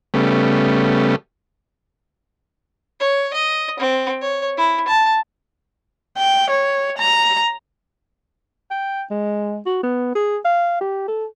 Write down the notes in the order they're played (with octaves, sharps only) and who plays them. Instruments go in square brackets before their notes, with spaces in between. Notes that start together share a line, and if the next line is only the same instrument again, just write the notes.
[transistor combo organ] C#3 G3 A3 B3
[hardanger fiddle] C#5
D#5
C4
C#5
E4
A5
[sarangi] G5
C#5
A#5
[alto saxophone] G5
G#3
F#4
B3
G#4
F5
G4
A4